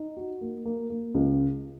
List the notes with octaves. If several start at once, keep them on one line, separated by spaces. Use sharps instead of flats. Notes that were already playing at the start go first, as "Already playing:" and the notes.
Already playing: D#4
F#4
A#3
A#3
A#3
C#2